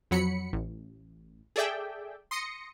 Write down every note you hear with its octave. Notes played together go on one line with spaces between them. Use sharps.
F2 F#3 B5 C#7
A1
G#4 A4 D5 E5 G5
C6 D#6 A#6 C#7